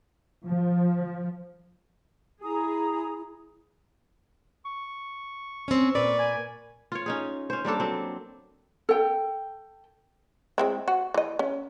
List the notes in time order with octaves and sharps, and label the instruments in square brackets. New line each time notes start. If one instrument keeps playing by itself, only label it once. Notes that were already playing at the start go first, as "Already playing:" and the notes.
[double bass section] F3
[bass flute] E4 [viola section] G#4 [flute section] A#5 D#6
[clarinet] C#6
[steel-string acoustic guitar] C4 C#4
[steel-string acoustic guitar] A#2 A#3 B4 [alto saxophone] D5
[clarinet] G#5
[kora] F4 C#5
C#4 D#4 G#4
C#4 C5
G3 A#3 D4 A4
F#3 C4
[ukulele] A4 G5
[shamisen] G#3 C4 E4
F#4
E3 D#5
C#4